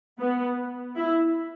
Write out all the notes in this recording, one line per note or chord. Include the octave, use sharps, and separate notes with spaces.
B3
E4